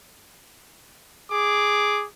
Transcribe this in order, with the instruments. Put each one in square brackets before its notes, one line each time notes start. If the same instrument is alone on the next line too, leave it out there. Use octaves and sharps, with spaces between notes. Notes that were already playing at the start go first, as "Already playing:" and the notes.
[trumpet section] G#4 D6